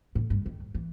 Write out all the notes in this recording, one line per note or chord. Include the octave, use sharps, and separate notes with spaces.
A2
G2
D#3
E3